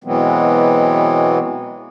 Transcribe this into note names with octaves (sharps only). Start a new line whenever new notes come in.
B2 E3 F#3 G#3 B3 C4